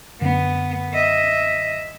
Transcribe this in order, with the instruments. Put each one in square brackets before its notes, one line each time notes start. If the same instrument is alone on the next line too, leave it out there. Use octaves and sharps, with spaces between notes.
[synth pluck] F#2 D3 [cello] B3
[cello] D#5 E5